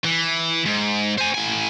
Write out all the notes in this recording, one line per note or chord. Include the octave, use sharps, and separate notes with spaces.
E3
G#2
C5 G#5
A2 G#5